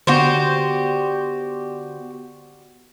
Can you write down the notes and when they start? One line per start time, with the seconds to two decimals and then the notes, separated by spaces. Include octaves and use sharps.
0.07 D3 B3 F#4 G4 C5 D5